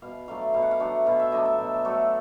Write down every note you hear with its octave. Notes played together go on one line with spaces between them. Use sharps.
B2 F5
F#3 A3 D4 F5
B2 F5
F#5
F5
F#3 A3 D4 F#5
B2 F5
E5
F#3 A3 D4 D#5
E5
B2
F#3 A3 D4